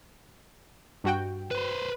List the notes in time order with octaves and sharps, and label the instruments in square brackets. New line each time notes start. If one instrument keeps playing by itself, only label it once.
[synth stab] G2 F#4 G5
[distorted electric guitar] B4 C5